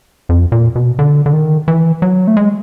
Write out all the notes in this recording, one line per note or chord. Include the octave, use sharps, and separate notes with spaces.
F2
A#2
B2
D3
D3
D#3
E3
F#3
A3
G#3